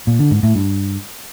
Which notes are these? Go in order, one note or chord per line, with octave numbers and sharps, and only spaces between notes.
A#2
D3
G#2
A2
G2